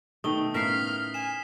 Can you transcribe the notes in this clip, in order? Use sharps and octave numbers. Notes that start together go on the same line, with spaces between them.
B2 D#3 A3 D#6 G7
A2 C#3 B3 A#4 E5 F6 B6 C7
G#5 E7